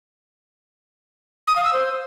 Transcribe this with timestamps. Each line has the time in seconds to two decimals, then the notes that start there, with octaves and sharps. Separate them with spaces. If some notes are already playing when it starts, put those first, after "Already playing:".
1.47 D#6
1.56 F5
1.64 E6
1.73 C5